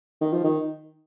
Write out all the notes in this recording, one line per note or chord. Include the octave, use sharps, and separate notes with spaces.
D#3
F3
D#3